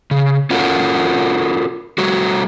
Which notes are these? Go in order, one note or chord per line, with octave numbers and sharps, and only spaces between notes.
C#3
C#4 F4 F#4 A4 A#4
G3 A3 F#4